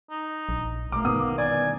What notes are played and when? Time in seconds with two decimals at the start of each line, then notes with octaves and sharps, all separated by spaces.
0.10 D#4
0.49 A#1
0.92 B1 A3 A#3 D6
1.05 G1 B2 D#3 B3 D#6
1.38 D5 G#5